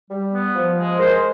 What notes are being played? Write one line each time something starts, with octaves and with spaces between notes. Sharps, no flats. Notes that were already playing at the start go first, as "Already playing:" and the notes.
G3
B3
F3
G#3
G#3 A#4 C5